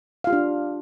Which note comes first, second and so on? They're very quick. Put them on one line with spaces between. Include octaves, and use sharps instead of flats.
F5 F4 G4 D4